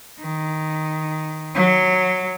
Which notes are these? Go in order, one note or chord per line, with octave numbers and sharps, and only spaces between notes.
D#3
F#3